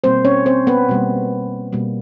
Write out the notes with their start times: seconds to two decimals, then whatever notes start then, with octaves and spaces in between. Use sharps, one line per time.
0.04 B2 G3 A#3 C4 C5
0.25 C#4 C#5
0.46 C4 C5
0.67 B3 B4
0.89 B2 G3 A#3
1.73 B2 G3 A#3